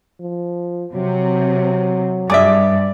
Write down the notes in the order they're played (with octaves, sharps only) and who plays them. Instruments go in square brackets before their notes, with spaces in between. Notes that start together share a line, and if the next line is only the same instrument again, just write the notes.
[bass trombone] F3
[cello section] C3 [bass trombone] F#3
[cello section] G2 [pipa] G#4 E5 [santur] D5 D6